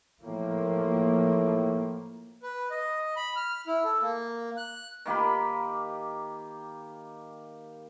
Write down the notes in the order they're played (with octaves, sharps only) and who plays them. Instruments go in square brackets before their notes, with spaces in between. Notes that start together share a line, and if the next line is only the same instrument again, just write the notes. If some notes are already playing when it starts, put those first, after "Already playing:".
[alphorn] A2 [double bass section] F3 A#3
[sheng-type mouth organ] B4
D#5
B5
F6
E4
A4
A#3
F#6
[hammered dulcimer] D#3 A#3 G4 B5